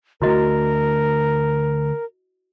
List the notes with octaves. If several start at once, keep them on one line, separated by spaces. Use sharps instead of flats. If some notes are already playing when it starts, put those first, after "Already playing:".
D3 A3 E4 F#4 A#4 D#5